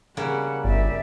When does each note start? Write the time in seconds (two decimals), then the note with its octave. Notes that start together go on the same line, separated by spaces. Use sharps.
0.17 C#3 G3 A#3 F#5
0.65 G1 D5 E5